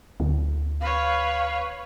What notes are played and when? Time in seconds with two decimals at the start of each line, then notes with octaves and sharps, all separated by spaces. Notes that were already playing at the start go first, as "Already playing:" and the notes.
0.20 D2
0.81 B4 C#5 F5